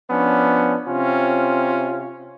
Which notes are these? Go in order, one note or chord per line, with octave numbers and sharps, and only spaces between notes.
F3 B3 C#4 D4
C3 C4 C#4 F4